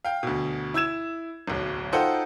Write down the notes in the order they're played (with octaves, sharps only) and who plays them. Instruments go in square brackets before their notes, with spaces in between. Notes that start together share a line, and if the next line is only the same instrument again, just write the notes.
[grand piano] F5 G5
D2 B2
E4 E6 G#6 E7
D1 B1
D#4 F4 A4 C5 F#5 G5